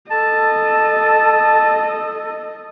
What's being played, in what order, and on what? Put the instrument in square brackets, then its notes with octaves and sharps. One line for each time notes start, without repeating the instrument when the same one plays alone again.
[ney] A4 [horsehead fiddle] D#5 [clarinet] A5